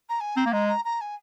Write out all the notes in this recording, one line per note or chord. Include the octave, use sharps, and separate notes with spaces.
A#5
G#5
C4 A#5
A#3
G#3 A#5
A#5
A#5
G#5